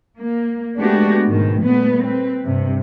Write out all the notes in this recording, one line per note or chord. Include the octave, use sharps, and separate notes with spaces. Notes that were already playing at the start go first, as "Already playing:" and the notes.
A#3
G#3 A3 B3 D4 F#4 G4
G#2 B2 D#3
A#2 G3 A3 B3
C4 B4
G2 C3